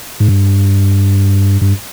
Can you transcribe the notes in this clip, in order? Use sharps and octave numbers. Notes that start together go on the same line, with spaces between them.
G#2
G2
G2